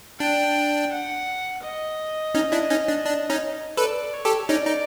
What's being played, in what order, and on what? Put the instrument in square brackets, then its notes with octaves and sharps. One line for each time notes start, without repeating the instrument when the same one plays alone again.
[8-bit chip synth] D4 [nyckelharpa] G5
[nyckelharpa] F#5
D#5
[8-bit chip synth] C#4 D#4
D4 E4
C#4 D#4
D4
D4
C#4 D#4
[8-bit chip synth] A4 B4 [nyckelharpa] D5
[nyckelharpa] C#5
[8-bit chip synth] G4 A4
[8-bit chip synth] C#4 D#4 [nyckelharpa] D5
[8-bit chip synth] D#4